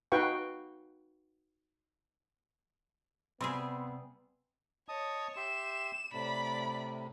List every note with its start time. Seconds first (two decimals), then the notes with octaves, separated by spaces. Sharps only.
0.12 D#4 F#4 B4 F5 G5 C#6
3.41 C3 G3 B3 G#4 B5 C6 E6
4.89 C#5 D#5 A5 D#6
5.36 G4 E5 C6 E7
6.13 A2 C3 D5 B5